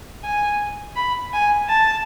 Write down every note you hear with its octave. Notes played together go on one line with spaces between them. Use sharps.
G#5
B5
G#5
A5